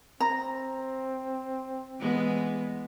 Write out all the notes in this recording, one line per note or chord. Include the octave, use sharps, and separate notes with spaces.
C4 A#5
E3 G#3 B3